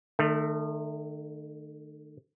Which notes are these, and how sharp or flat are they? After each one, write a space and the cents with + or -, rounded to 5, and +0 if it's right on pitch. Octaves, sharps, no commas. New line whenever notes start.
D#3 -40 A3 +0